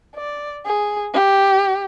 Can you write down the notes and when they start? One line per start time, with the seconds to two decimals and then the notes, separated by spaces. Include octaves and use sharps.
0.16 D5
0.65 G#4
1.13 G4